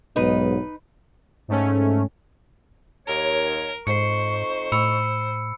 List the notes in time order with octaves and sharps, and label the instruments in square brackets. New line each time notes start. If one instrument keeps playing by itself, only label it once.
[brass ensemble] B1 G#2 [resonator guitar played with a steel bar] D#4 B4
[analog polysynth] G#2 A3 C#4
[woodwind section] D#2 C#5 [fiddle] A#4
[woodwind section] F2 D#4 C#6 [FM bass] G#2 [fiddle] C5 [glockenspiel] C7 C#7
[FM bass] A2 [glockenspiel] B5 E6 C#7